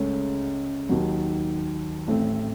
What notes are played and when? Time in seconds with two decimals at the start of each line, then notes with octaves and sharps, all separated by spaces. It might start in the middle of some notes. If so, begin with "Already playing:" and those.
Already playing: C#2 C#3 A3 C#4
0.89 D#2 D#3 F#3
2.07 A1 A2 A3 C4